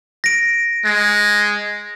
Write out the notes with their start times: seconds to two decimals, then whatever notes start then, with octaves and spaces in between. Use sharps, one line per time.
0.24 A#6 D7
0.85 G#3